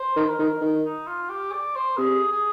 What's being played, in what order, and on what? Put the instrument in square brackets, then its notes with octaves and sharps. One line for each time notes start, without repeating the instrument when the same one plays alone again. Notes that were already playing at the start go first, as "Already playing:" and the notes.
Already playing: [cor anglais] C5
[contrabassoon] D#3
[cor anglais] A#4
[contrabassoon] D#3
D#3
[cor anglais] D#4
F4
G4
D5
C5
[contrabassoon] C3 [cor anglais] G#4
[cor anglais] G#4